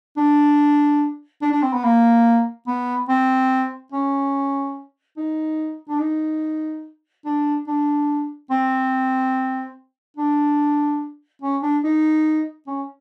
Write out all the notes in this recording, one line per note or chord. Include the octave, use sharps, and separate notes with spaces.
D4
D4
D4
C4
B3
A#3
B3
C4
C#4
D#4
D4
D#4
D4
D4
C4
D4
C#4
D4
D#4
C#4